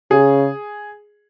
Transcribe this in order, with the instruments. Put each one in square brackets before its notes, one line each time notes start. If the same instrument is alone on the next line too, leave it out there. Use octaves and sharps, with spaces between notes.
[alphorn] C#3 [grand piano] G#4